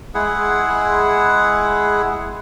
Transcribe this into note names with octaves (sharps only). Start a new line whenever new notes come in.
G#3 E4 G#4 F#5